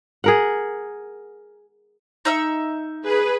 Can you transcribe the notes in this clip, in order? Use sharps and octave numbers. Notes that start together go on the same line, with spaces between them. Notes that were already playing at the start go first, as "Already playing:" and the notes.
G#4 A#4 F#5
D#4 E5 E6
G#4 B4